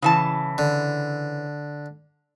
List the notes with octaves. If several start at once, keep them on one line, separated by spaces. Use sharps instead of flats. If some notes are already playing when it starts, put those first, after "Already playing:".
C#3 E3 A5
D3